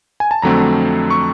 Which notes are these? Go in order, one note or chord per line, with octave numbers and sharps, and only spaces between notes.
G#5
A5
F2 D3 F#3 A3 C4 A#5
C#6